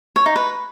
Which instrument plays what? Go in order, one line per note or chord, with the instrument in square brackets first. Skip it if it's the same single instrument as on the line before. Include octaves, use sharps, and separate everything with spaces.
[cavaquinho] C#5
D#4
B4